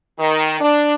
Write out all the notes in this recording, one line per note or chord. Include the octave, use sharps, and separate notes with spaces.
D#3
D4